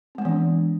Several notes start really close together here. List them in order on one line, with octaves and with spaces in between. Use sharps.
C4 G#3 B3 E3 D4